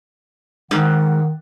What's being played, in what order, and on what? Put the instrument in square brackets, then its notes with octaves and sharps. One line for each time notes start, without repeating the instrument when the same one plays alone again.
[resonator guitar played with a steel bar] G#2 [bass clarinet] D#3 [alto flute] F#5